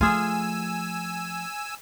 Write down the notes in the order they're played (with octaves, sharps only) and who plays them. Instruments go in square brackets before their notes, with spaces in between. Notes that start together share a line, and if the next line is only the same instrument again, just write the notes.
[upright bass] F3 A3 [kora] F4 G#4 [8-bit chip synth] G#5 E6